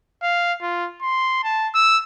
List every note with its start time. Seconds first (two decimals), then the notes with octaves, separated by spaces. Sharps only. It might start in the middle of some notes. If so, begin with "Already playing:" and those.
0.23 F5
0.62 F4
1.02 C6
1.44 A5
1.74 E6